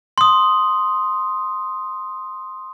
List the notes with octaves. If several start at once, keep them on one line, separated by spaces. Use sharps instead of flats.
C6 D#6